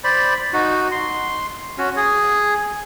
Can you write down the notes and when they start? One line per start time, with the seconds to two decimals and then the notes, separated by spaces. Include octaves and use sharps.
0.04 C5 D5 B5
0.53 D#4 F#4
0.92 C6
1.78 C#4 F#4
1.96 G#4